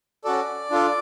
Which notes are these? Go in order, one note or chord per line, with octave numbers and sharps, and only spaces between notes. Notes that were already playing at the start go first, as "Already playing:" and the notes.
C#4 F#4 A4 D5
D4 F4 A4